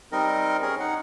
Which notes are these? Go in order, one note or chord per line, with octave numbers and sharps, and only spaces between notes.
G3 C4 D#4 A#4 D#5
C#4 G#4 A#4
D#4 F#5